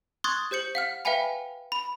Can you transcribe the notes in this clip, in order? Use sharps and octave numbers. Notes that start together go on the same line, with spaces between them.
C6 C#6 D#6 F#6 G#6 A6
G4 C5 G6 C#7 F#7
F5 F#5 F6
B4 E5 F5 G5 G#5 B5
B5